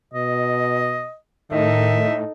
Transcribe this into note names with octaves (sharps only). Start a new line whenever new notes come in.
B2 D#5
A2 D#3 D#4 A4 E5